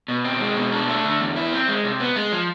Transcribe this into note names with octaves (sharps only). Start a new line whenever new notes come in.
B2
C4
G#3
B2
D4
A3
D3
E2
E4
C4
G#3
C3
B3
G#3
F3